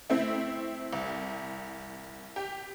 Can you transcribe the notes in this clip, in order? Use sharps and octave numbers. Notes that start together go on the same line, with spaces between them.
A3 C4 E4
C2
G4